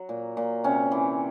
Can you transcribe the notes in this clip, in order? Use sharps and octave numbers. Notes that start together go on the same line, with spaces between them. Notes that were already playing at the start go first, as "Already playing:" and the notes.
Already playing: F#3
A#2
A#2
C3 C#4
E3